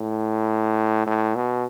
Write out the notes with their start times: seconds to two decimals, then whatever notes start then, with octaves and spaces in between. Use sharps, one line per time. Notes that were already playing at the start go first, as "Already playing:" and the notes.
Already playing: A2
1.07 A2
1.35 B2